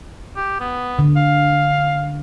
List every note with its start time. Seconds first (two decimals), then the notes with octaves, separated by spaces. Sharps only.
0.36 G4
0.60 B3
0.99 D3
1.16 F5